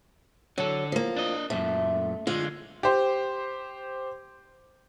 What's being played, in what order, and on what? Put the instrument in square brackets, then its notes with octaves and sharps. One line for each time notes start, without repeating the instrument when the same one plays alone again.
[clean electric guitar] D3 A4 [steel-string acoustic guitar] F#3
[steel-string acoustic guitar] F3 A#3
[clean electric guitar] D4 D#5
[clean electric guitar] F#2 A#2 [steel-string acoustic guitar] A3
[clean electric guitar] D3 G#3 [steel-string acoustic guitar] F4
[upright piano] G4 C5